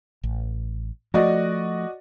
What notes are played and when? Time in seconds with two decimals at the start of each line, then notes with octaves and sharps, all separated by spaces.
0.24 A1
1.14 F3 A3 F#4 D5 D#5